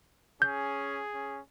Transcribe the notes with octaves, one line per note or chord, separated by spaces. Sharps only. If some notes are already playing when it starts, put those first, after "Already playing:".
C#4 G#4 G6
C#4